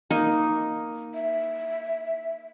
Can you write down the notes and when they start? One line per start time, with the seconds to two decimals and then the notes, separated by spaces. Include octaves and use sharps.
0.11 A#3 D#4
1.14 E5